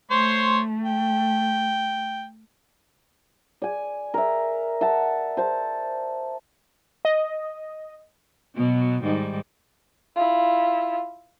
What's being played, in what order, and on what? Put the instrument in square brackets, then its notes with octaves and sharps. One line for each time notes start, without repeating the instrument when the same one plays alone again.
[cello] A3 [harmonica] C5 C#5 C6
[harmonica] G5
[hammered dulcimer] D5 G#5
A#4 E5
E5 F#5 A5
C5 A5
[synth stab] D#5
[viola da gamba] B2 F#3 B3
G#2 D#3 G3
[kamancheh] E4 F4